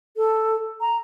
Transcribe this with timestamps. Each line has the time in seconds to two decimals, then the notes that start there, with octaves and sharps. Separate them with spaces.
0.17 A4
0.81 A#5